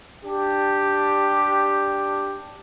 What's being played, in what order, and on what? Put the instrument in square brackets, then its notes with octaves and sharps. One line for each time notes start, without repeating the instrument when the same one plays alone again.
[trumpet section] D4 G4